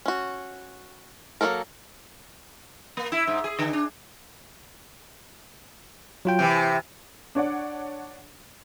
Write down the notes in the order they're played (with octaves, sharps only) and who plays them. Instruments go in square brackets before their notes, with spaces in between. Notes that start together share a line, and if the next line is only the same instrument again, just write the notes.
[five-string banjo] C#4 F#4
F#3 A3 A#3 A4 A#4
[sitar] A#3
E4
G#2
G#4
D3
D4
[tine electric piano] F#3 F4 G5
[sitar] C3 E3 [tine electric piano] G5
[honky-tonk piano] D4 C#5 D5 F#5